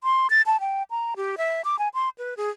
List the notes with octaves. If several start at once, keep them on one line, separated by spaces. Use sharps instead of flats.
C6
A6
A5
G5
A#5
G4
E5
D6
G#5
C6
B4
G#4